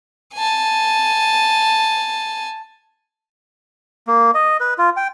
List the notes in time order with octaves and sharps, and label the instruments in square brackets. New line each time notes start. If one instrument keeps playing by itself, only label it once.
[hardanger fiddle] G#5 A5
[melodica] A#3
D#5
B4
F4
G5